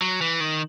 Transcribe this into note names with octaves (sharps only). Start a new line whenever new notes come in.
F#3
E3
D#3